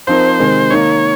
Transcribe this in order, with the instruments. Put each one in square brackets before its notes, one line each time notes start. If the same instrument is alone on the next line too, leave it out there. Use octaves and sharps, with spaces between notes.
[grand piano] F3 C4 D#4 A#4 [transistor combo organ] C5
[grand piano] C3 D#3 G#3
[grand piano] D#3 A#3 D#4 [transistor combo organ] C#5